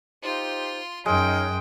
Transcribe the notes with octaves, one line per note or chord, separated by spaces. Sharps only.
D#4 F4 G4 C5 C6
F#2 G#3 D#4 C#5 G5 F6